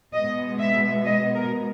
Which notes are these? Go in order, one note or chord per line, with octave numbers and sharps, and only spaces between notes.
B2 G#3 B3 D#5
E5
D#5
A#4